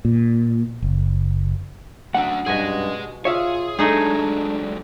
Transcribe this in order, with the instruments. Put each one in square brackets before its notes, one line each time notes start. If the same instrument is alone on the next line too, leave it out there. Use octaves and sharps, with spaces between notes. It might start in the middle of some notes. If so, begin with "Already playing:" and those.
[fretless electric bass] A#2
F#1
[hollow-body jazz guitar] F#2 F#5 [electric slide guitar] A3 D4
[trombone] G2 [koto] B2 F#4 G#5 [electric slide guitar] G#4 D#5
[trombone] F4 [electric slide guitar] G#4 [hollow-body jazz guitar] C#5 E5 F5
[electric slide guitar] F#3 G#3 [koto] A3 D#4 G#4 [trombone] D4